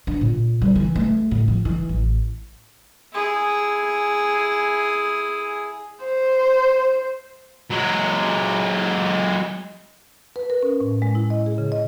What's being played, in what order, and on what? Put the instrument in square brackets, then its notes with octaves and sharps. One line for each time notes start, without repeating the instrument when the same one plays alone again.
[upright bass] D4
A#2
G3
E3
A3
A2
F3
E3
A1
[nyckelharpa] E4 G#4
[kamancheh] C5
[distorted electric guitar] F#3 G#3
[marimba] B4
A#4
C#4
A2
G#3
E4
D#5
G#4
C#3
D#5